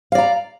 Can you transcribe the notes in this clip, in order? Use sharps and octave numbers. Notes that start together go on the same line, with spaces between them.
D5 F5 A#5